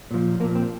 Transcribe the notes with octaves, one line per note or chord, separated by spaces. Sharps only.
A#2 F3
A#2 F3 A#3
C4